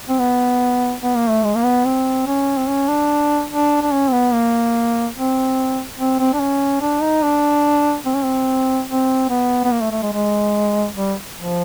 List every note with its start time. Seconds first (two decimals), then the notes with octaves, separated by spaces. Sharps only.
0.09 C4
0.19 B3
1.02 B3
1.16 A#3
1.29 A3
1.43 G#3
1.55 A#3
1.64 B3
1.85 C4
2.27 C#4
2.57 C4
2.67 C#4
2.88 D4
3.50 D4
3.82 D4
3.92 C#4
4.08 C4
4.12 B3
4.33 A#3
5.16 C4
5.99 C4
6.19 C4
6.33 D4
6.40 C#4
6.81 D4
7.02 D#4
7.23 D4
8.05 C4
8.14 C#4
8.23 C4
8.88 C4
9.29 B3
9.64 B3
9.71 A#3
9.81 A3
9.92 A3
10.02 G#3
10.13 G#3
10.95 G3
11.36 F3